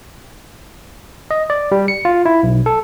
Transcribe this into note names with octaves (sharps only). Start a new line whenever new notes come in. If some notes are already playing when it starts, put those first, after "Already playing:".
D#5
D5
G3
C#7
F4
E4
B1
A4